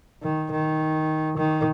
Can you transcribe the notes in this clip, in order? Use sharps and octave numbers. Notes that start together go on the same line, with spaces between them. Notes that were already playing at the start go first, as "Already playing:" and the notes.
D#3
D#3
D#3